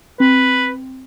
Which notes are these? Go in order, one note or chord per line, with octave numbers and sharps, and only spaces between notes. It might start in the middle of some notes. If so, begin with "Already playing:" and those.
C4 B4